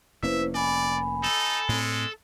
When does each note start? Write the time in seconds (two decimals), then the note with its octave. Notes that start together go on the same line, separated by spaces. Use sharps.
0.23 F1 A#3 C#4 E4 B4 C5 E5
0.54 D5 G#5 B5
1.23 D#4 A4
1.69 A2 G#3 C4